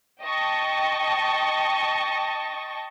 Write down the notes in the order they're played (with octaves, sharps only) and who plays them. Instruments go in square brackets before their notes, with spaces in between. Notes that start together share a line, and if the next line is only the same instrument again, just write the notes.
[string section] D#5 G5 A5 C#6